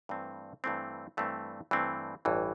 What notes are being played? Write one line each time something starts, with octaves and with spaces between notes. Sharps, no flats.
G2 E3 A3 C4
G2 E3 A3 C4
G2 E3 A3 C4
G2 E3 A3 C4
A1 G2 E3